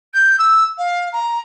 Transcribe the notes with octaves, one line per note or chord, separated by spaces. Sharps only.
G6
E6
F5
A#5